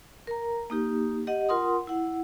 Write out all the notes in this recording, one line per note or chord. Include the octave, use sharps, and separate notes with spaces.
A#4 A#5
A#3 D#4 G4
G4 D#5 F#5
F4 A#4 F#5 C6 D#6
E4 F#5